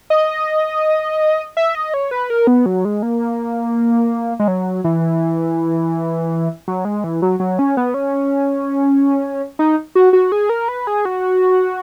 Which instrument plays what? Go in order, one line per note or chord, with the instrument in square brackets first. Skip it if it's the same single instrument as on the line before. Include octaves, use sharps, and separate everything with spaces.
[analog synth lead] D#5
E5
D#5
C#5
B4
A#4
B3
F#3
G#3
A#3
G#3
F#3
E3
F#3
G#3
E3
F#3
F#3
C#4
B3
C#4
D#4
F#4
F#4
G#4
A#4
B4
G#4
F#4